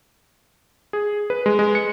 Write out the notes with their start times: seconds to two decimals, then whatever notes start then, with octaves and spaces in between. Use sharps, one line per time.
0.93 G#4
1.30 B4
1.46 G#3
1.59 G#3
1.75 C#7